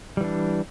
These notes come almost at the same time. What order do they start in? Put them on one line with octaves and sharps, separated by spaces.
G3 E3 D4